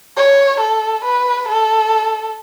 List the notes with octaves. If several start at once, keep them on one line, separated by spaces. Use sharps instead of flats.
C#5
A4
B4
A4